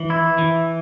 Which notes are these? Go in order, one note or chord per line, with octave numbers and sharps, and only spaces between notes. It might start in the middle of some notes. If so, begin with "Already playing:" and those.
Already playing: E3
E4
E3